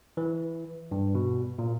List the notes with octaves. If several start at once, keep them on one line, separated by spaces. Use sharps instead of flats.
E3
G2
B2
A#2